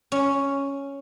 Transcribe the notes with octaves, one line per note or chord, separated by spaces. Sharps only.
C#4